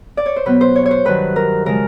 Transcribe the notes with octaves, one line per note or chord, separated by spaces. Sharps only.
D5
C#5
C5
B2 F#3 B3 B4
C5
C#5
C#5
C5
G2 D#3 F#3 B4
A#4
C#3 F3 G#3 A#4